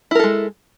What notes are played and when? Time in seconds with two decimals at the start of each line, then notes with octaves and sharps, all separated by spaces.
0.11 E4
0.15 A#4
0.19 A4
0.24 G#3